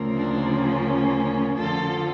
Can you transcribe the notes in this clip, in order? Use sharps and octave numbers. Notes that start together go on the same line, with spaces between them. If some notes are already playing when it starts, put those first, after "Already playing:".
Already playing: D2 C#3 F3 A#3
D4
C#4
F2 D3 F3 F4 A4